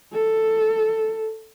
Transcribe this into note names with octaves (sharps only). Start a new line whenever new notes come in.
A4